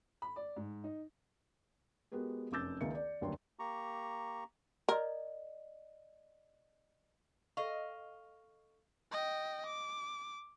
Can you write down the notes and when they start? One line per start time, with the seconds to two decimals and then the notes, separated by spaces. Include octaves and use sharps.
0.22 B5
0.36 D5
0.56 G#2
0.84 D#4
2.12 G#3 B3 F#4 G4 A#4
2.52 F1 F#2 D6 E6 G6 A6
2.81 C#2 D#3 A#3 E5 C#7
2.95 D5
3.21 F#1 D2 G2 F#3 G5 C6
3.59 A#3 G4 A#5 C#6
4.89 A#4 D5 D#5
7.57 A4 D#5 F5 C#6
9.12 D#5 G5
9.65 D6